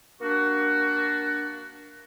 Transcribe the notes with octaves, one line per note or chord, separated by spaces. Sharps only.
A#3 D4 F#4